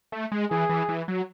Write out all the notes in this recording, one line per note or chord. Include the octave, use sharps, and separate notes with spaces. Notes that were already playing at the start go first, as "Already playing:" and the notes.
A3
G#3
E3 G#4
E3
E3
F#3